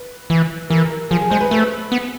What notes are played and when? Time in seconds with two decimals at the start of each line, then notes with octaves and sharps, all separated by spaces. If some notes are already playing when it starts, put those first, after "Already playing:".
Already playing: B4
0.30 E3
0.70 E3 A#4
0.84 A#4
1.10 F3 G#4
1.22 G#4
1.30 G#3 C5
1.41 B4
1.51 A3 B4
1.92 B3